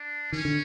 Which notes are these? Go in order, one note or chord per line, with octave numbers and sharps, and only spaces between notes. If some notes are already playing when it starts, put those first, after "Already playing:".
Already playing: D4
D#3 C#4
D3